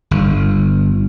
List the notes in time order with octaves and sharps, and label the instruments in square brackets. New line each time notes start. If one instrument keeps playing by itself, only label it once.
[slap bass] G1